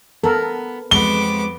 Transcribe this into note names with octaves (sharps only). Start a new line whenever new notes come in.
B3 A4 A#4
F2 G#3 B3 C4 F#4 D6 G7